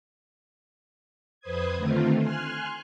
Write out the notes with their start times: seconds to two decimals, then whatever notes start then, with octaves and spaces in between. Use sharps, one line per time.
1.40 F2 B4 C5 D#6 G#6
1.76 D3 D#3 A3 C4 F4
2.19 G#5 C6 F6 F#6